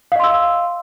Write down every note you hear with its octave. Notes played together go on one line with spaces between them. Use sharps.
D#5 F5 C6 E6